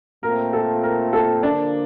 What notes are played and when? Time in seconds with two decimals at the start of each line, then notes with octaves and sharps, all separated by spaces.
0.23 A#2 A3 C4 F4 A#4
0.53 A4
0.83 A#4
1.13 A4
1.42 D3 F3 A#3 D4